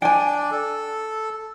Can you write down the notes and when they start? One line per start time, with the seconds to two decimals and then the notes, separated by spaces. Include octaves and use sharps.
0.02 D4 D5 G5 G#5
0.51 A4